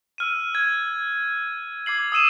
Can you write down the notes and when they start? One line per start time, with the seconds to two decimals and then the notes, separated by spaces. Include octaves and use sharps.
0.18 E6 F6 D#7
0.55 G#6
1.86 D6 G#6 C7 F#7
2.12 D#6 E6 D#7 E7